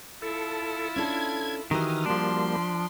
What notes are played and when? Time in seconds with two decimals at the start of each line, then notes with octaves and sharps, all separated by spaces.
0.22 E4 F4 A4
0.96 C#4 D4 A4 G#6
1.71 D#3 E3 F#4 G4 A#4 D#6 F6
2.06 F3 G3 A#3 D4 C6